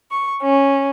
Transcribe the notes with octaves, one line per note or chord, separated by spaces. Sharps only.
C#6
C#4